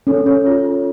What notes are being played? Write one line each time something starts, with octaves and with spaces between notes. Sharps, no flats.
C#4 A4
C#5
F4
F4